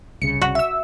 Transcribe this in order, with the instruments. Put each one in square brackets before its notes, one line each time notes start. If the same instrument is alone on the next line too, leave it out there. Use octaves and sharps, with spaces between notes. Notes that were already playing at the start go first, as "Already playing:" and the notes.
[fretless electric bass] C2 C#3 [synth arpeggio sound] C#7
[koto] F#4
[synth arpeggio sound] E5 E6